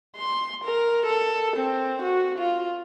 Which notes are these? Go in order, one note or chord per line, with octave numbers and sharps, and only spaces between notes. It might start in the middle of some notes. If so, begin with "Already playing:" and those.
C6
A#4
A4
C4
F#4
F4